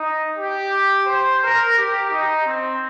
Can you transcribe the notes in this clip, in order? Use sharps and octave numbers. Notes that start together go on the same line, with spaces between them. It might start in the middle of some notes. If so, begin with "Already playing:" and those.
Already playing: D#4
G4
C5
A#4
G4
D#4
C4